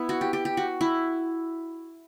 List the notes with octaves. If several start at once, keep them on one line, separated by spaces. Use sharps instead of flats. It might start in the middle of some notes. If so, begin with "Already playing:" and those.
Already playing: B3 E4
F#4
G4
G4
G4
F#4
E4